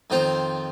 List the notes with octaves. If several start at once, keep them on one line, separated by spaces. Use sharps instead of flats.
F2 D#3 C4 F4 C5